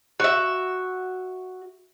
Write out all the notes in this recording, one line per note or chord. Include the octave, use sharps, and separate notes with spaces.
F#4 E5